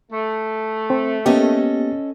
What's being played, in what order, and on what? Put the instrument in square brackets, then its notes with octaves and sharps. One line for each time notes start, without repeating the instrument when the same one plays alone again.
[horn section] A3
[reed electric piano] C4
[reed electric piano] A#3 B3 G4 [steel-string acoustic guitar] C#4 A4 D#5